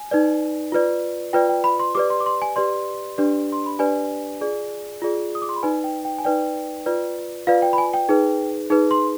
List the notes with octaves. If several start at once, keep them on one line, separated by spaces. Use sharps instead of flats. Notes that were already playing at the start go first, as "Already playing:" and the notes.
Already playing: G#5
D#4 B4 D5
F4 B4 D5
F4 B4 D5 G5
G5
B5
C6
G4 B4 D5 D6
C6
D6
C6
G#5
G4 B4 D5 C6
D4 G4 B4 D5
C6
B5
D4 G4 B4 D5 G#5
F4 G#4 D5
F4 G#4 D5
D#6
D6
C6
B5
D#4 B4 D5 G#5
G5
G5
G#5
D#4 B4 D5 G5
F4 B4 D5
F4 B4 D5 F5
G5
B5
G#5
G5
D#4 G#4 B4
D#4 G#4 B4
C6